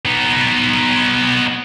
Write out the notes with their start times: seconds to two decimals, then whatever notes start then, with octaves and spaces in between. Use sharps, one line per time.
0.05 B3 D#4